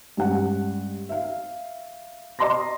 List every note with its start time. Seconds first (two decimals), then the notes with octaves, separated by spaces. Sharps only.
0.17 G2 G#3 C#4 F#5
1.09 E5 F5
2.39 D#5 A#5 C6 D6 A#6